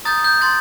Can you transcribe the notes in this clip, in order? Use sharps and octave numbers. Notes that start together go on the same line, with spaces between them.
A#5 D#6 G6 A6
G6
C6 A6